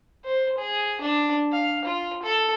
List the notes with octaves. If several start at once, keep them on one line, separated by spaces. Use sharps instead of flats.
C5
G#4
D4
F5
F4
A4